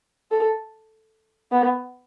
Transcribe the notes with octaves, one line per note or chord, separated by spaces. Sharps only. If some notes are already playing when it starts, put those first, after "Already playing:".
A4
B3